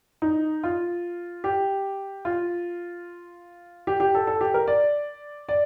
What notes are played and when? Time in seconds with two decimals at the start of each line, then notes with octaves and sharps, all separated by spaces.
0.22 D#4
0.64 F4
1.44 G4
2.25 F4
3.87 G4
4.00 G4
4.15 A4
4.27 A4
4.41 G4
4.54 A#4
4.68 D5
5.49 D5